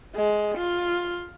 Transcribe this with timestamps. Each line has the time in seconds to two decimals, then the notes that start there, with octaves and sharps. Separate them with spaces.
0.16 G#3
0.58 F4